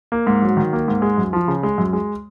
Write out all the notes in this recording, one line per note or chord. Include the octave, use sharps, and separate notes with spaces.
A#3
G#2
F#3
D#3
A#3
G#2
G#3
F#2
F3
C#3
G#3
F#2
G#3